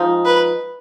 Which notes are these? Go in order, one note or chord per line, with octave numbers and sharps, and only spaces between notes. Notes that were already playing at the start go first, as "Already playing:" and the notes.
Already playing: F3 G#3 D#4
B4